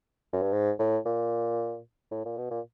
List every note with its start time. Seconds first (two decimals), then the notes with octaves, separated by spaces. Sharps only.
0.33 F#2
0.42 G2
0.53 G#2
0.79 A2
1.06 A#2
2.11 A2
2.25 A#2
2.37 B2
2.51 A#2